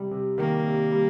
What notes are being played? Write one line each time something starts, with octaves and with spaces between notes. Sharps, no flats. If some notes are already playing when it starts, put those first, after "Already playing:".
Already playing: C3 G3
C3
D#3 A#3
C3
G3